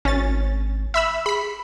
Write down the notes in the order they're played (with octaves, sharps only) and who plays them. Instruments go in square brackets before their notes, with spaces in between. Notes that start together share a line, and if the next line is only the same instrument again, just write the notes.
[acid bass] G#1 [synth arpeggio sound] C#4 A6
[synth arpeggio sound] E5 B5 E6
[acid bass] G#4 [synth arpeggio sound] B5 B6